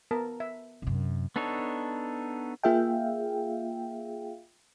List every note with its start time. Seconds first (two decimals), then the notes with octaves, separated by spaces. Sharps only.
0.11 B3 A#4 A5
0.40 E5
0.82 F#2 C3
1.36 B3 D4 D#4 A4 C#5
2.63 A#3 F4 G#4 E5 F5 G5